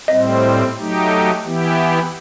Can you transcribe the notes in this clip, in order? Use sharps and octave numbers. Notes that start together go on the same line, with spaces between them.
A2 G3 C4 D#5
F#3 A3 D#4 G4
E3 B3 E4 G4